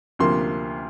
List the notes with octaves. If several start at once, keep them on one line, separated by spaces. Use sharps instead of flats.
D2 C3 F3 A#3 C6